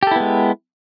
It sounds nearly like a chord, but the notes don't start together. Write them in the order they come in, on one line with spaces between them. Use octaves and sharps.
G4 A4 E4 B3 G#3